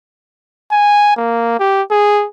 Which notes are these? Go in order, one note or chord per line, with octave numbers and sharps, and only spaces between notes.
G#5
A#3
G4
G#4